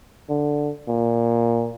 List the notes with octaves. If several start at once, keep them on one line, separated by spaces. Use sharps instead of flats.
D3
A#2